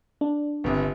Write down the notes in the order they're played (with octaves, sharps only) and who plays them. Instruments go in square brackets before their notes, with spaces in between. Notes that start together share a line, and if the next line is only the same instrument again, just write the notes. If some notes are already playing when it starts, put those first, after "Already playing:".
[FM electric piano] D4
[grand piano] G1 C2